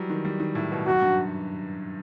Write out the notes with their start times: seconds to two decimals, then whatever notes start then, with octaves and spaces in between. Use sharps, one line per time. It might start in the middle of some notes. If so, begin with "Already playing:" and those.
Already playing: E3 F#3 G3
0.10 D#3
0.25 G3
0.40 D#3
0.55 A2
0.72 B2
0.86 F#2 F#4
1.02 G2